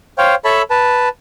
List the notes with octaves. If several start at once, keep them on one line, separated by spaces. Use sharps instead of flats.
C5 C#5 F5 G5
A4 C#5 E5 A5 B5
B4 A5